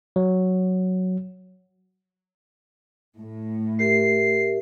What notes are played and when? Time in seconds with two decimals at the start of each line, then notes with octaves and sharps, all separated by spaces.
0.16 F#3
3.18 A2
3.79 G4 A#4 E5 C7